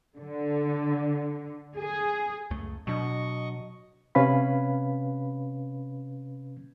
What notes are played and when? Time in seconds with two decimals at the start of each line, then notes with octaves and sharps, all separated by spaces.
0.18 D3
1.77 G#4
2.51 C#2 F#2 A3
2.87 B2 F#3 D4 D#5 C#6
4.15 C3 C#4 B4 F5 B5